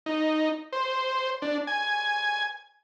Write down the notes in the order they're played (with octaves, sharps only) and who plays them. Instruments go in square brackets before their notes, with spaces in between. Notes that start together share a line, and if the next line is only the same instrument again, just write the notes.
[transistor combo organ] D#4
C5
D4
G#5